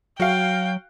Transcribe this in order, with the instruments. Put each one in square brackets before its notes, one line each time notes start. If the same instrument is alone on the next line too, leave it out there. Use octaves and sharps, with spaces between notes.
[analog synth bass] F#3 [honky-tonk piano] F#4 F5 [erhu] G5